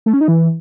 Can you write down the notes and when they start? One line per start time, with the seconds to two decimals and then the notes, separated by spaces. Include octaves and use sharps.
0.06 A3
0.13 C#4
0.21 D#4
0.28 E3